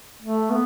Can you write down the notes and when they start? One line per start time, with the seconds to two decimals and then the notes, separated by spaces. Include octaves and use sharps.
0.22 A3
0.51 B3